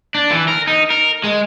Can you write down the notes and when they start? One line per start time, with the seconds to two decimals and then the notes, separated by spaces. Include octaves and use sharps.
0.15 D4
0.31 E3
0.48 A#4
0.67 D#4
0.90 A#4
1.24 G#3